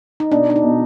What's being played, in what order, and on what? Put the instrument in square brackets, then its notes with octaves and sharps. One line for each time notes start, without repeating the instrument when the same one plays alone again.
[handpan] D#4
[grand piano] B2 [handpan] D4
[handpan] D4
D#4
[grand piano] B2